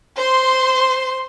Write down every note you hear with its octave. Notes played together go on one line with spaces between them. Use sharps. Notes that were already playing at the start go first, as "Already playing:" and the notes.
C5 C6